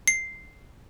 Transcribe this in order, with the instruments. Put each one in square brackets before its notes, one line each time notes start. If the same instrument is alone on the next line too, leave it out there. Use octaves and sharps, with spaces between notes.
[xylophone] C7